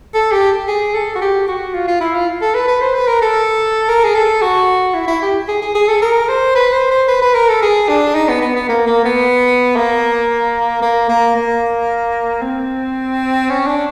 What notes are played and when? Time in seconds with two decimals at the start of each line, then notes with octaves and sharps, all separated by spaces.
0.14 A4
0.32 G4
0.68 G#4
0.94 A4
1.16 F#4
1.21 G4
1.48 F#4
1.74 F4
1.88 F4
2.01 E4
2.15 F4
2.41 A4
2.55 B4
2.68 B4
2.81 C5
2.94 B4
3.08 A#4
3.22 A4
3.89 A#4
4.04 G#4
4.15 A4
4.42 F#4
4.94 E4
5.08 E4
5.22 G4
5.48 G#4
5.62 G#4
5.75 G#4
5.88 A4
6.02 A#4
6.29 C5
6.55 B4
6.73 C5
6.91 C5
7.08 B4
7.22 B4
7.35 A#4
7.49 A4
7.63 G#4
7.89 D4
8.15 D#4
8.29 B3
8.42 B3
8.56 B3
8.69 A#3
8.87 A#3
9.04 B3
9.76 A#3
10.82 A#3
11.10 A#3
11.36 A#3
12.42 C4
13.50 C#4
13.67 D4